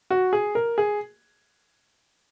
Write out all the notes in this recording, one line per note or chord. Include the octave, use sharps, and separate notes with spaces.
F#4
G#4
A#4
G#4